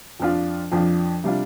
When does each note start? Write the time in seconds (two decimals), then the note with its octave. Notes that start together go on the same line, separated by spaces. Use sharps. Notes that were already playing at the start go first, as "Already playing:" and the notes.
0.20 F2 F3 D4 F4
0.72 F2 F3 D4 F4
1.24 C3 G3 D4 F4